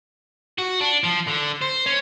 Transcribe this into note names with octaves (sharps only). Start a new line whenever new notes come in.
F#4
D4
F3
D3
C5
C#4